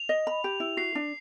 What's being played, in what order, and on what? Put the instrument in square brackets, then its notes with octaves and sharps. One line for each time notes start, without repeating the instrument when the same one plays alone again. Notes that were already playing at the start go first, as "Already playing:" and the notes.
Already playing: [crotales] F7
[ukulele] D#5
B5
G4
E4
[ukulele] F#4 [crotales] C7
[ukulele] D4